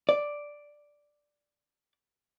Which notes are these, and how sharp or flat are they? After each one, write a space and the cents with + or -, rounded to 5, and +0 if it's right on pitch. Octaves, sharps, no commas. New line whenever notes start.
D5 +0